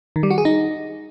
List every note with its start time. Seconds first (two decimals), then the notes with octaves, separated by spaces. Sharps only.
0.16 D#3
0.23 G3
0.30 F#4
0.38 G#4
0.45 D#4